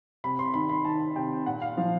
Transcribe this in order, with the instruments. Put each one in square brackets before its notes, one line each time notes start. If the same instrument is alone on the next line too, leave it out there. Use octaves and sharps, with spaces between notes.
[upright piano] C3 B5
C6
D#3 B5
B5
D#3 A5
C3 G5
A#2 F#5
F5
F3